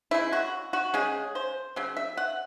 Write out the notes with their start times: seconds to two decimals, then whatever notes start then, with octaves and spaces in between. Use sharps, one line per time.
0.11 C#3 G#3 E4
0.33 F#4
0.73 F#4
0.94 C#3 G#3 G#4
1.35 C5
1.76 C#3 F#3
1.97 E5
2.17 F#5